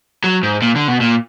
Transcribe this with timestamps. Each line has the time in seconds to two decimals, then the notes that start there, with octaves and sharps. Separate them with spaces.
0.24 F#3
0.43 G#2
0.62 A#2
0.76 D3
0.88 B2
1.01 A#2